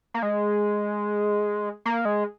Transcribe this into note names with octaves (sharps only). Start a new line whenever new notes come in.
A#3
G#3
A#3
G#3